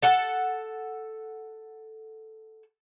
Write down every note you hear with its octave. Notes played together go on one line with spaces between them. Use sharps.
A4 F#5 A5